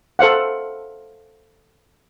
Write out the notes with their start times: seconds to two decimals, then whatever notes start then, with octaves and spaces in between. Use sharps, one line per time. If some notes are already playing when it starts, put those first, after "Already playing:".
0.19 A4 C5 F5 F#5